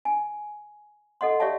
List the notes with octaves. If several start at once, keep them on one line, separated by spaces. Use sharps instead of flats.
G#5
A4 D#5 F#5 C6
G4 C#5 D5 E5 F5 A5